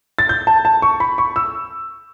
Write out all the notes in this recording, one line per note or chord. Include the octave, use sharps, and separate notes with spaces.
A6
G6
A5
A5
C#6
B5
C#6
E6